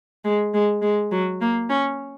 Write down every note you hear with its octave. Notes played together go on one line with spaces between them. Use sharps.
G#3
G#3
G#3
F#3
A#3
C#4